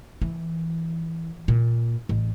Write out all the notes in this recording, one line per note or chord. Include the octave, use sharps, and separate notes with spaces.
E3
A#2
A1